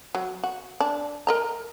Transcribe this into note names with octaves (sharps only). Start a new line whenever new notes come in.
F#3
F#4
D4
A#4 D#5 A#5